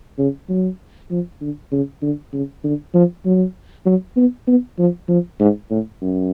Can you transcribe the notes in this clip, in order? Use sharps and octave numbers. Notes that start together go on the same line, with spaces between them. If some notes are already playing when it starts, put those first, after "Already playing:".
C#3
F#3
F3
D3
C#3
D3
C#3
D3
F3
F#3
F#3
B3
B3
F3
F3
G#2
A2
F#2